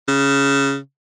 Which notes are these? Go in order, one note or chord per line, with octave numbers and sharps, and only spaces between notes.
C#3